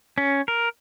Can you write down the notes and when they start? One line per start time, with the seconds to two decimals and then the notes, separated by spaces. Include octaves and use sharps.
0.18 C#4
0.48 A#4